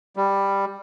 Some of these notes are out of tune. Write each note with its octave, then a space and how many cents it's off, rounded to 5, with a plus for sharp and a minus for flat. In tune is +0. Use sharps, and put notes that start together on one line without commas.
G3 +10